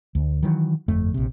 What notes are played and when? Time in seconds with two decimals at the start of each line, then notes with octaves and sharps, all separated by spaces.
0.15 D2
0.43 D#3 E3 F#3
0.88 G1 F2 A3
1.14 A#1 C3